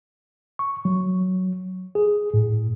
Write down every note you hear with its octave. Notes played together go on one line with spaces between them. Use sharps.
C#6
F#3
G#4
A2